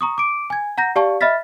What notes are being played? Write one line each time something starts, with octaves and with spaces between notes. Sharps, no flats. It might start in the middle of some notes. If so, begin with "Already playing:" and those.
A#5 C#6 D#6
D6 D7
G#5 G#6
F#5 A#5 G6 A#6
G4 D5 F5 A5 C#6
D#5 E5 B5 F6 A6 B6